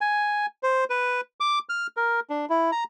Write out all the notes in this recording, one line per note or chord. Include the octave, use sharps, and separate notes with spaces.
G#5
C5
B4
D6
F6
A#4
D4
E4
A#5